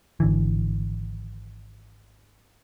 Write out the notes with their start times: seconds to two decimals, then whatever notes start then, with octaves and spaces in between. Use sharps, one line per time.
0.20 G#1 D3 E3